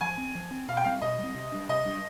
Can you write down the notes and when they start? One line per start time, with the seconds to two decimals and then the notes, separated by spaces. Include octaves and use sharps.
0.01 F3 G#5
0.17 C4
0.35 F3
0.51 C4
0.68 B2 F5
0.77 G5
0.84 G3 C4 F5
1.01 B2 D#5
1.18 G3 C4
1.35 C3
1.52 G3 D4
1.69 C3 D#5
1.85 G3 D4